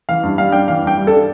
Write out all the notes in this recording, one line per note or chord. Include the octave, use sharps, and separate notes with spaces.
E3 F5
G2
G3 F5
D4 G5
E3 F5
G2 G5
G3
D4 A4